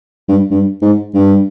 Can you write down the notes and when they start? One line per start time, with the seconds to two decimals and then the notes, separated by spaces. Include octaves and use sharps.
0.29 G2
0.50 G2
0.82 G#2
1.14 G2